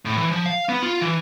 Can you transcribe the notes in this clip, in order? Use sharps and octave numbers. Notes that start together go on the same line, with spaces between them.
A2
E3
F3
F5
B3
F4
E3